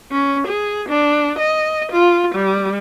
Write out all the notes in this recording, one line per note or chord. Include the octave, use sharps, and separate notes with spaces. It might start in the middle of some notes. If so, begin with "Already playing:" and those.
C#4
G#4
D4
D#5
F4
G3